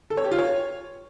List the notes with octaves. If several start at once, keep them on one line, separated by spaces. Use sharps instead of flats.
A4
C#5
G4
F4
C#5